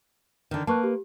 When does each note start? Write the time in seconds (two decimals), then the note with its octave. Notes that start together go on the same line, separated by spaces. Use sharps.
0.51 D3 D#3
0.67 A#3 B4 A5 C#6 F#6
0.84 G4